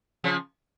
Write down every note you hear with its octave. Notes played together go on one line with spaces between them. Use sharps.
C#3 F3